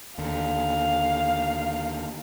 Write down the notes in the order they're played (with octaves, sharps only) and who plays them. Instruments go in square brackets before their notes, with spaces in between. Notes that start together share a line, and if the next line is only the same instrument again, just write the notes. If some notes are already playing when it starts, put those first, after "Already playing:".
[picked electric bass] D#2 D3 [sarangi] F5